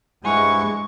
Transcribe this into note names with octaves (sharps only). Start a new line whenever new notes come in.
G2 G#3 E4 C5 F#5 G#5 C#6